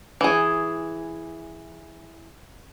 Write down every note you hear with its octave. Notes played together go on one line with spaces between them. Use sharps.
E3 G#4